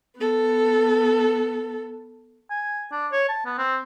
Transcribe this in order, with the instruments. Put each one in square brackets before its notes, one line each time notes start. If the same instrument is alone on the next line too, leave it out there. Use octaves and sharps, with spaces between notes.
[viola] B3 A4
[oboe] G#5
D4
C#5
A5
B3
C4